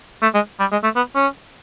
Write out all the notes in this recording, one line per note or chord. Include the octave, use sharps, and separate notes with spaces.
A3
G#3
G3
G#3
A3
B3
C#4